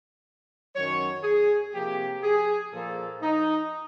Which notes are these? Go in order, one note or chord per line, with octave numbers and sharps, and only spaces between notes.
F#2 D#3 F#3 C#5
G#4
C3 F3 A#3 G4
G#4
A#2 F3 A#3 A4
D#4